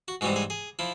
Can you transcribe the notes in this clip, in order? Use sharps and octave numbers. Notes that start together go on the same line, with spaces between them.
F#4
G#2 E3 G3 C4 F#4
G#4
G#4
F3 E4